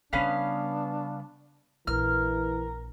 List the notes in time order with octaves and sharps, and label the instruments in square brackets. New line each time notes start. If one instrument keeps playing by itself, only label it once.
[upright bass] C#3 G3 [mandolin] B3 C#4 F5 [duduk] D4
[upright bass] A#1 [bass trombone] E3 [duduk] A#4 [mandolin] F6